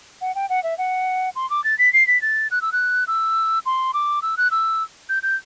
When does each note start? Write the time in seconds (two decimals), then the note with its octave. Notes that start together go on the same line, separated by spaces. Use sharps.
0.21 F#5
0.35 G5
0.50 F#5
0.64 E5
0.78 F#5
1.36 C6
1.50 D6
1.64 A6
1.79 B6
1.93 C7
2.07 B6
2.22 A6
2.51 F#6
2.62 E6
2.72 F#6
3.07 E6
3.66 C6
3.94 D6
4.22 E6
4.37 F#6
4.51 E6
5.09 G6
5.23 G6